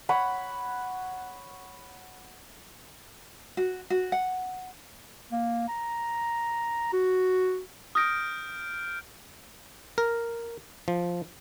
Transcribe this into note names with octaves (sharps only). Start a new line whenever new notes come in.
C#5 F#5 B5
F#4
F#4
F#5
A#3
A#5
F#4
D#6 F6 G6 A#6 D7
A#4
F3